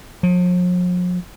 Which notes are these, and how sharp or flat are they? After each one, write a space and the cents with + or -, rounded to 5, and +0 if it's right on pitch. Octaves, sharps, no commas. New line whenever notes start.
F3 +45